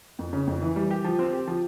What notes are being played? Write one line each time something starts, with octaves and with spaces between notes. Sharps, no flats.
F2
C#3
F2
E3
G3
G4
F3
C4
G4
F3